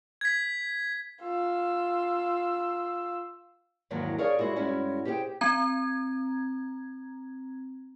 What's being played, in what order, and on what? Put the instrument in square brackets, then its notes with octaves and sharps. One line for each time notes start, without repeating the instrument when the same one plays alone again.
[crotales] G#6 B6
[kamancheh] F4 E6
[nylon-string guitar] E2 G#2 D#3 F#3 A#3 D4
G#4 A#4 C#5 D5 F5
G3 G#3 E4 F#4 G#4
G2 G#3 C#4 E4 F#4
G4 G#4 C5 F#5 G5
[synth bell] C4 A#5 G#6